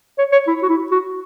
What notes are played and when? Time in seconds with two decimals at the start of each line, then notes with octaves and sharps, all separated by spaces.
0.18 C#5
0.32 C#5
0.48 E4
0.63 F#4
0.69 E4
0.91 F#4